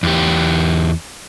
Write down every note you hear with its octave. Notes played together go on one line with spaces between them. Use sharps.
E2 G4